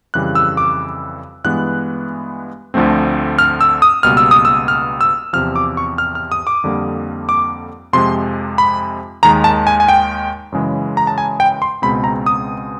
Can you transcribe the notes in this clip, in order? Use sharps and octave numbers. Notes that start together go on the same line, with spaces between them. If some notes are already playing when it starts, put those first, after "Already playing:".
F2 C#3 E3 G3 F#6
E6
D6
G2 E3 G#3 B3 F#6
D2 D3 F3 A3 C4
F6
E6
D#6
C#2 B2 G3 A#3 F6
E6
D#6
E6
F6
E6
E2 C3 F3 F6
D6
C#6
F6
F6
D#6
D6
F2 D3 G3 A#3
D6
F2 C3 F3 G#3 C6
B5
D#2 D#3 G#3 A#5
A5
G#5
G#5
G5
F#2 C#3 E3 G#3
A#5
A5
G#5
G5
C6
C#2 B2 G#3 C4 B5
A#5
D#6